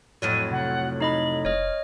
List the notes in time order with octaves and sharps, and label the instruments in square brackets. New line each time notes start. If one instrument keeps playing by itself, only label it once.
[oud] F2 A2 F#3 [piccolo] D#7
[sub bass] C3 [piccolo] F#5
[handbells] D#4 D#5 B5 [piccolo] F#7
[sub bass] F1 [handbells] C#5 D#5 [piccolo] F6